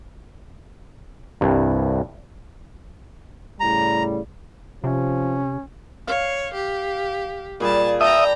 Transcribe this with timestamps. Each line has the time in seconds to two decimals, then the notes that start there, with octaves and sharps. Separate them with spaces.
1.41 C2 G2
3.60 A2 C#3 G3 A#5
4.84 C3 F3 C#4
6.07 C#5 F5
6.54 G4
7.60 A#2 G3 G#4 A5
8.01 D5 E5 G5 A5 A#5 D#6